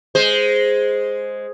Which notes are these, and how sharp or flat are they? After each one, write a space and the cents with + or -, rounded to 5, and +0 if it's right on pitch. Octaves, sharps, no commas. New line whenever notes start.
G#3 +0 C5 +0